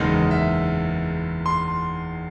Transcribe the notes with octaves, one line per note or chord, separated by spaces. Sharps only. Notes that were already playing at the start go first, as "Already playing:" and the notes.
Already playing: F#1 E2 D#3 G#3 D#5
E5
C6